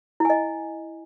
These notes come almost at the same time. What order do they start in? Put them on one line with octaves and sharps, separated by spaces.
E4 G#5 D#5